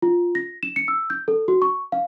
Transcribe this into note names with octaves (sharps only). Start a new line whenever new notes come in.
F4
A#6
E7
C#7
E6
G6
A4
F#4
C#6
F5